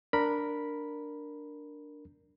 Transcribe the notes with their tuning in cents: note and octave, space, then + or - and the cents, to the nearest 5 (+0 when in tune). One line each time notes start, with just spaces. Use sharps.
D4 +0 A#4 -5 B5 -5